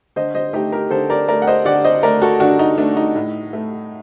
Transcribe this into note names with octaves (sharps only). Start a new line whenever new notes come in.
D3 C5 D#5
C5 D#5
A3 D#4 G4
G4 A#4
D3 A4 C5
A#4 D5
A3 A#4 D5
F#5
C5 D#5
D3 D5 F#5
C5 D#5
A3 A#4 D5
F#4 A4
D3 D4 F#4
D#4
A3 D4
D#4
A2
A3